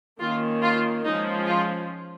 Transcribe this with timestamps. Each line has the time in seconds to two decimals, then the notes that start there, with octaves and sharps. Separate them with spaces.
0.20 D#3 A#3 C#4 F4
0.63 F4
1.05 F3 G#3 C#4 D#4
1.47 F4